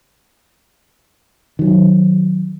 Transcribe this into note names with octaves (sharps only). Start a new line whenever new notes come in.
D#3 F#3